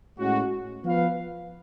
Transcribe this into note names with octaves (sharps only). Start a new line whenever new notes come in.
A2 G#3 C#4 F#4
F3 B3 F4 B4 F5